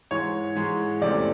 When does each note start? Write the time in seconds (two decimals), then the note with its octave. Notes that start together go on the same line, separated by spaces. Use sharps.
0.11 G#2 E3 G#3 C#5
0.55 G#2 E3 G#3
1.01 E2 C3 E3 A3 C#4 D5